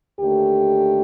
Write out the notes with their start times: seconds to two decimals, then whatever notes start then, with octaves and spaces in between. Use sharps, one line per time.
0.20 D#2 D3 A3 G4